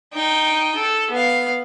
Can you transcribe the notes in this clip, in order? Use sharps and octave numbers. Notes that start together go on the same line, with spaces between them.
D#4 G5
A4
B3 F5